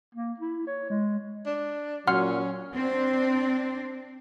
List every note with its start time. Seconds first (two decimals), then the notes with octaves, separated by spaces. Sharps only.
0.15 A#3
0.40 E4
0.67 C#5
0.90 G#3
1.46 D4
2.07 A#2 F#3 C#4 F#5 C6 F6
2.74 C4 D4